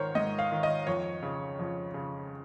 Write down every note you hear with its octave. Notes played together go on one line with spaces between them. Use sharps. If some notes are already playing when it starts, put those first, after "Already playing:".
Already playing: G#2 D#3 A#4 C5 C#5
G#2 D#5
F5
D#3
D#5
F2 C#5
C#3
F2
C#3